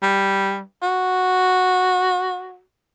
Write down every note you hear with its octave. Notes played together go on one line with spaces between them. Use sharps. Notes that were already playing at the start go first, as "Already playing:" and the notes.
G3
F#4